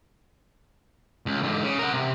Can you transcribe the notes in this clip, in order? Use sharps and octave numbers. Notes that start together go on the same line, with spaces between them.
C#2
G#2 D3
C#3
A#4 F#5
C3